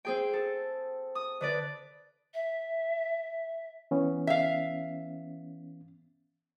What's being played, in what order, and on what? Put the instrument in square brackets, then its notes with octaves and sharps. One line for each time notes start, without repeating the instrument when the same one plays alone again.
[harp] C4 G#4 G5
A4
D#6
D3 B4 D5
[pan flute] E5
[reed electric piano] E3 B3 C#4
[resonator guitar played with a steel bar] E5 F5